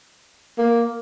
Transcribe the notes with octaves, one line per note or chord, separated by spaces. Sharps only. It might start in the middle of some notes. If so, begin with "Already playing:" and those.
A#3